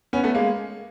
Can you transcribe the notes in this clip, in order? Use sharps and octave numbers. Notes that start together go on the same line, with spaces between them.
B3 C#4
A3 B3
G#3 A#3